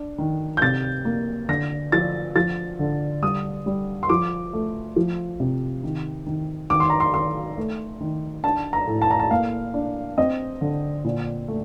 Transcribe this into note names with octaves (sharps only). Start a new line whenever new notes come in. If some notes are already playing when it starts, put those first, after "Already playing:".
Already playing: D4
D#3
G6
C3 A6
A#3
D3 A#6
F3 A6
F3 A6
D3
G3 D#6
G3
C6
F3 D6
A3
F3
C3
D#3
D#3
D#3 D6
C6
A#5
C6
D#3 C6
A3
D#3
D4 A5
A#5
A2
A5
A#5
A5
A#3 F5
D4
C4 D#5
D3
A#2
A3